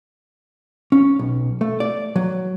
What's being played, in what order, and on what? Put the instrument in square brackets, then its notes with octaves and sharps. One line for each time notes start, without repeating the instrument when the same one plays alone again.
[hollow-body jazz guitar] C#4
B1
A3
D5
F#3